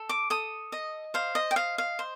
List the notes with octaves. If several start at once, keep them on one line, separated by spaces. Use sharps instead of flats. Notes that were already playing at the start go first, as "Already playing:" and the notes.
Already playing: A4
D6
A4 D#6
D#5
C5 F5
D#5
G5
D#5 F5
F5
C5